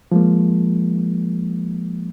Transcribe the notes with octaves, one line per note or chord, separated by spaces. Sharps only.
F3 G#3 A#3